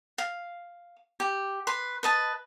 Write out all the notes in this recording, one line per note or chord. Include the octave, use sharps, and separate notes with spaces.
F5
G4
B4 C6
B4 D#5 A5